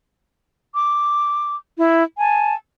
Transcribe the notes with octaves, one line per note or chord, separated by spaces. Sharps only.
D6
E4
G#5 A5